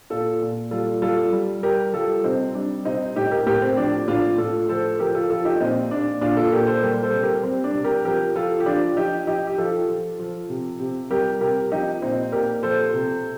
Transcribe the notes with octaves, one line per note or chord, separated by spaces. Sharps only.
A#2 F4 A4
A#2
G3 F4 A4
G3 F4 A4
G3
G3 G4 A#4
G3 F4 A4
C3 C4 D#4
G3 D4
C3 C4 D#4
A2 D#4 G4
G4 A#4
A2 G4 A#4
C4
F3 D4
A2 D4 F4
A2 F4 A4
F3 A4 C5
F3 G4 A#4
F4 A4
F3 F4 A4
D#4 G4
A#2 C4 D#4
A#2 D4
A#2 D4 F4
F4 A4
A#2 G4 A#4
A4 C5
G3 G4 A#4
A4 C5
C3
G4 A#4
G3 C4
D4
C3
G4 A#4
F3 G4 A#4
F3 F4 A4
G4
F3 D4 F4
F3 D#4 G4
F3 D#4 G4
G4
F3 F4 A4
F3
F3
C3
C3
G3 G4 A#4
C3 G4 A#4
F3 D#4 G4
A#2 C4 D#4
A#2 G4 A#4
F3 A4 C5
C3